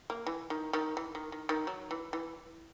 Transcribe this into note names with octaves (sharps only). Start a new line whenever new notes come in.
A#3
E3
D#3
D#3
E3
D#3
D#3
D#3
F#3
E3
E3